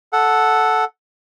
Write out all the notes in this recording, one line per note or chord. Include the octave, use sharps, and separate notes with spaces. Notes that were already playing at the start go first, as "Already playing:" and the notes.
A4 F#5